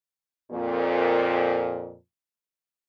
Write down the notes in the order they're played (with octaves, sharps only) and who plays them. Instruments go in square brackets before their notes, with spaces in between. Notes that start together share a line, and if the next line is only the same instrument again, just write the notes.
[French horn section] F2 A#2